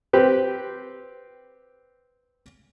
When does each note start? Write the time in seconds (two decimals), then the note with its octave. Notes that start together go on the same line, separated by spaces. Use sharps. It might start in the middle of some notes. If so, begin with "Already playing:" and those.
0.13 C4 G4 B4